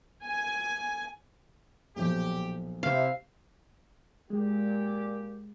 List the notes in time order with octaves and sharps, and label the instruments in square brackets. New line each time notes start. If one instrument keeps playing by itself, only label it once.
[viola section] G#5
[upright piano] B1 A#2 F3 [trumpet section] G4
[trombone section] C3 [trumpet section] E4 C5 E5 [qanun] F5
[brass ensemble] A#2 G4 [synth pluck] G#3